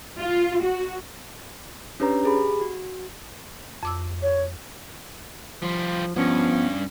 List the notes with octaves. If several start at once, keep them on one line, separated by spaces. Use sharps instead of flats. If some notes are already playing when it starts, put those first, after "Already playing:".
F4
F#4
C#4 D4 G4 B4 C#5 A#5
G4 G#4 B5
F#4
F2 D6 E6
C#5
F3 G3 F4
G2 F3 B3 C#4